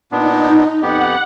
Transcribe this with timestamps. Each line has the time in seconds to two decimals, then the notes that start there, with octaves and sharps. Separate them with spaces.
0.12 A#2 B3 D4 D#4
0.82 F2 B3 G4 F#5